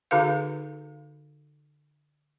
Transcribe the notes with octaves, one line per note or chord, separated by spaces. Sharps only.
D3 D#4 F#4 G#4 B4 F5